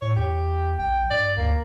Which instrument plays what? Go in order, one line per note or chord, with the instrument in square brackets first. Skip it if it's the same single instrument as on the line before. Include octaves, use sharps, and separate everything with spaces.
[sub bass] A2 [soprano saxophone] C#5
[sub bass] E2 [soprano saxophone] G4
[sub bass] A#1 [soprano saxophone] G5
[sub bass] G2 [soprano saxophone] D5
[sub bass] D2 [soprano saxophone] A#3